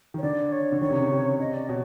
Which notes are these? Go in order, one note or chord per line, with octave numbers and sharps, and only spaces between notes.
D#3
C#5
D3 D5
C#5
D3
D#3 C#5
C3
C#3
C3
D#5
D5
B2 C#5